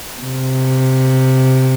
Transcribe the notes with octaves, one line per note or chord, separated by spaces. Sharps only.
C3